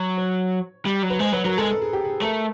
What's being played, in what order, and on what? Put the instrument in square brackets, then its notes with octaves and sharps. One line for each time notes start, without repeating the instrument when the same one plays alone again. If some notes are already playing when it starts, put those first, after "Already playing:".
Already playing: [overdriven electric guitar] F#3
[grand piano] C#5
[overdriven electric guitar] G3
F#3
[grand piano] B4
[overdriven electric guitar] G#3 [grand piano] C5
[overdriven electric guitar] F#3 [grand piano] B4
[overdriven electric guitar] F#3 [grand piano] A#4
[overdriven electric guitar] G#3 [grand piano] A4
[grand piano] A4
G#4
G4
G#4
[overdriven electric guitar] A3 [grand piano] A#4